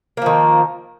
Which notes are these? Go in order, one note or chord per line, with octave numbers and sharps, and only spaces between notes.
D#3 F3 A#3